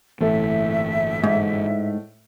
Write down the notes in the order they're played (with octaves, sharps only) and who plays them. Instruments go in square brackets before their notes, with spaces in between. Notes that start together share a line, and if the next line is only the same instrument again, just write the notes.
[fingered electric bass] G1 E3 [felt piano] A2 A4 [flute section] E5
[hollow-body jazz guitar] G#2